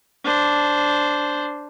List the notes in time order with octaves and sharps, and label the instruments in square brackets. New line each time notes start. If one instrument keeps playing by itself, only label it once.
[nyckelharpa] D4 C5